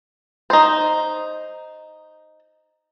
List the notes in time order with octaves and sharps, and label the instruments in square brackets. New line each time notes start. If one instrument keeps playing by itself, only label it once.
[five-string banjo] D#4 C5